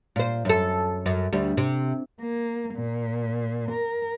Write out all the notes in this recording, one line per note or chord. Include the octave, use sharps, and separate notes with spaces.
A#2 C5
F#2 A4
F#2
D2 G3
C3
A#3
A#2
A#4